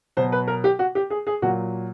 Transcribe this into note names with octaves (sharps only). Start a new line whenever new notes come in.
B2 F#3 C5
B4
A#4
G4
F#4
G4
G#4
G#4
A#2 F#3 F#4